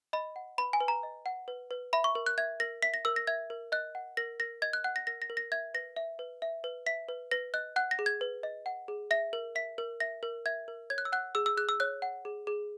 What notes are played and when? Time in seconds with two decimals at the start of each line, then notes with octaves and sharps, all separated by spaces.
0.13 D#5 B5
0.36 F#5
0.58 B4 B5
0.73 G#5
0.81 B4
0.88 A#5
1.03 D#5
1.26 F#5
1.48 B4
1.71 B4
1.93 E5 B5
2.04 C#6
2.15 A#4
2.26 F#6
2.38 E5 G#6
2.60 A#4 A#6
2.82 E5 B6
2.94 A#6
3.05 A#4 E6
3.16 A#6
3.27 E5 G#6
3.50 A#4
3.72 D#5 F#6
3.95 F#5
4.17 A#4 A#6
4.40 A#4 A#6
4.62 D#5 G#6
4.73 F#6
4.84 F#5 F#6
4.96 A#6
5.07 A#4 A#6
5.22 A#6
5.30 A#4
5.37 A#6
5.52 E5 G#6
5.74 B4 A#6
5.96 E5
6.19 B4
6.42 E5
6.64 B4
6.86 E5 B6
7.09 B4
7.31 B4 A#6
7.54 D#5 F#6
7.76 F#5 F#6
7.91 A#6
7.99 G#4
8.06 G#6
8.21 B4
8.43 D#5
8.66 F#5
8.88 G#4
9.11 E5 A#6
9.33 A#4
9.55 E5 B6
9.78 A#4
10.00 E5 A#6
10.23 A#4
10.46 E5 G#6
10.68 A#4
10.90 C#5 G#6
10.98 F#6
11.05 E6
11.12 F#5 F#6
11.35 G#4 E6
11.46 E6
11.57 G#4 F#6
11.69 E6
11.80 C#5 F#6
12.02 F#5
12.25 G#4
12.47 G#4